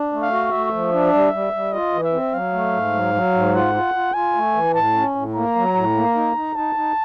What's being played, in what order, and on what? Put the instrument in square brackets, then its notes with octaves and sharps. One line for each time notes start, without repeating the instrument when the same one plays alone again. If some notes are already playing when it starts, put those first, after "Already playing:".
Already playing: [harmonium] D4
A3
[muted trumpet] F5
[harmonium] F#4
[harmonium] A3 [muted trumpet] E5
[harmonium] F3
D4
G3
G3
G3
[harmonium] F4 [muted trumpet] D#5
[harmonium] E3
[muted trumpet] E5
[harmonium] C4
[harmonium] F#3 [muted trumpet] F5
[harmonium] A3
G#2
F#3
F#3
G#2
[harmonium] F4 [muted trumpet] F#5
[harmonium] F4
F4
[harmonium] F4 [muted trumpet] G#5
[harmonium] A3
E3
[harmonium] A2 [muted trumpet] A5
[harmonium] C#4
A2
[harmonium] A#3 [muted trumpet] A#5
[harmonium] F#3
A2
A#3
D#4
D#4
[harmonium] D#4 [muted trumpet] A5
[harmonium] D#4